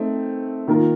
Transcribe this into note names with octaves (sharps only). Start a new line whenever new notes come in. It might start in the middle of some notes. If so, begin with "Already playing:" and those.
Already playing: A3 C4 D#4
D#3 A#3 F4 A#4